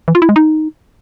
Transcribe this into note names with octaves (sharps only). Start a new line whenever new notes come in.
E3
F4
E4
G#3
D#4